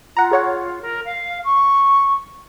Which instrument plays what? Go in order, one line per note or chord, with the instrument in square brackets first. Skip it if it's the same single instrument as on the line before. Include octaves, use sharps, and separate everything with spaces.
[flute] F4 [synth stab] F#5 A#5
[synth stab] G#4 C#5 F#5
[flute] A#4
F5
C#6